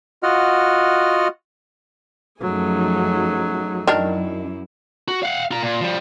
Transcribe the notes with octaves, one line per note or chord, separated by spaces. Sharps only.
F4 F#4 D#5 F#5 F6
F#2 F3 F#3 A3 D#4 G#4
F#2 D#3 D4 E4 A#4
F#4
F5 F#5
F4 A#5
A#2
F3 G3